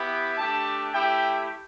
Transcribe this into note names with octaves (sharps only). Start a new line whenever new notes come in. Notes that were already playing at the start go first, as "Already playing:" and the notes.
Already playing: B3 E4 G4
A3 D4 G4 A5
A3 E4 G4 G5